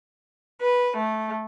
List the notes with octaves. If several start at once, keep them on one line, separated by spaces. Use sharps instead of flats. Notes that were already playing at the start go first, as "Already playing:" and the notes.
B4
A3